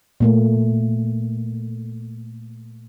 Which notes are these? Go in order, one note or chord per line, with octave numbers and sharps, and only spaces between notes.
A#2 A3 A#3